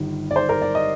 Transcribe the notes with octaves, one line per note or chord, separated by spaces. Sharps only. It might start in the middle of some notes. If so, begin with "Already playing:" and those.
Already playing: G1 G2 D#3
D5
C5
A#4
D5
D#5